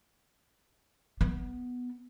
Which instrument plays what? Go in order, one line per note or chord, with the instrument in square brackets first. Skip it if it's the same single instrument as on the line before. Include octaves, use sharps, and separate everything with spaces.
[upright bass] B3